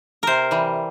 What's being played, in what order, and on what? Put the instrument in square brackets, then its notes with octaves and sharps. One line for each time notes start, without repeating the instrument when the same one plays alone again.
[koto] C3 A#4 C5
E3 G3